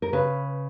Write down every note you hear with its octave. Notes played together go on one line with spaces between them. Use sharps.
A#4
C#3 B4